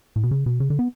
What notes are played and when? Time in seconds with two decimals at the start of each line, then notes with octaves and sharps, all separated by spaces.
0.16 A2
0.23 B2
0.31 C#3
0.46 B2
0.60 C#3
0.70 D3
0.79 B3